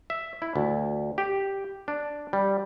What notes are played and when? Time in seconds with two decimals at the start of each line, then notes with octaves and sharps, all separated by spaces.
0.10 E5
0.42 E4
0.56 D2
1.18 G4
1.88 D4
2.33 G3